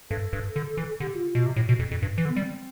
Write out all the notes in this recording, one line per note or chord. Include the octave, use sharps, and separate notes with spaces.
G2 A4
G2
D3
E3
D3 G4
F4
B2 F4
C3
A2
B2
F2
F2
G2
E3
D3
B3
G3 C4